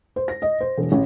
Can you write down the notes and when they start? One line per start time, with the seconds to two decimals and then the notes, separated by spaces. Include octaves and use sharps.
0.16 C5
0.28 A#6
0.42 D#5
0.60 C5
0.77 E1
0.92 A1